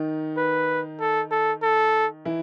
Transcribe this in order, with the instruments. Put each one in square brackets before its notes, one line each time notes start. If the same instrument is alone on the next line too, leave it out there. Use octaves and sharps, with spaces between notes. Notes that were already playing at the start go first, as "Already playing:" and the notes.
Already playing: [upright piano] D#3 D#4
[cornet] B4
A4
A4
A4
[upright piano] E3 E4